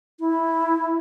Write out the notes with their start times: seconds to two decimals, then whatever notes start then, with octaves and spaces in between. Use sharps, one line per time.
0.20 E4